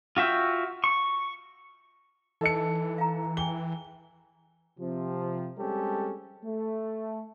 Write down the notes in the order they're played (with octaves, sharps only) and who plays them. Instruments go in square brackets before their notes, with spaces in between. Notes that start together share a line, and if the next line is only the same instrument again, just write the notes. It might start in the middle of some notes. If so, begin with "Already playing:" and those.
[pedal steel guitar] F4 F#4 E5 G5
C#6
[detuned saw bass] E3 [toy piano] D#4 D#5 [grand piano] A4 A5 C#7
[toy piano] F5 A#5
[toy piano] G#4 G5 G#5 [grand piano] G7
[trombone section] C3 F3
G3 G#3 C4 C#4 G4 A4
A3